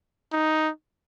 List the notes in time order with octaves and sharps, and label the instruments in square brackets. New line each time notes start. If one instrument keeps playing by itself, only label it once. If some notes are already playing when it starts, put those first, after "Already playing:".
[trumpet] D#4